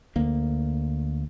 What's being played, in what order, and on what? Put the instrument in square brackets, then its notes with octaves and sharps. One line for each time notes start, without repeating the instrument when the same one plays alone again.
[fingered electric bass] D2 A#3